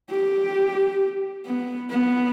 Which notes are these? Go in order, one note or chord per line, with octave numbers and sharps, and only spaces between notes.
G4
B3
B3